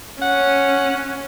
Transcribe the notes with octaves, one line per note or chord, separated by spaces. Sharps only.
C#4 F#5